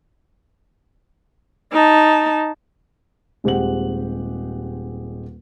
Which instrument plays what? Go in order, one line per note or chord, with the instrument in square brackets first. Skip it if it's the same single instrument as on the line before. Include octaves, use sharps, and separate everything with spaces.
[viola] D#4 A5
[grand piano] D#1 G#3 C4 G4 F#5 F#7